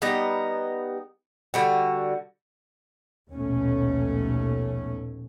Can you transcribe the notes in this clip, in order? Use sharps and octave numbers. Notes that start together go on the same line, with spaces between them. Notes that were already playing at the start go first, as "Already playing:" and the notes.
G3 B3 D#4 A#5
D3 G3 F#4
A#1 D#2 B2 A3 C#4